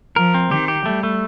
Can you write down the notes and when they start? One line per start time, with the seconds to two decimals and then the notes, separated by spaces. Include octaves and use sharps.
0.16 F3 A#4
0.34 C4
0.51 D#3 G4
0.68 G4
0.86 G3 A3
1.03 A3